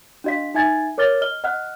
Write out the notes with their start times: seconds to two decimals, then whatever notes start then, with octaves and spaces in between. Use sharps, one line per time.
0.24 D4 F#4 D#5 F5 B6
0.54 D#4 E5 G#5 G#6 A6
0.98 A#4 C#5 D6 F6 A6 G7
1.22 D#5 F6 G7
1.44 D#5 F#5 F6 F#6